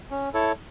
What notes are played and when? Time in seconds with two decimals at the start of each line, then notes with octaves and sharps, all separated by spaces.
0.11 C#4
0.34 E4 A4 C#5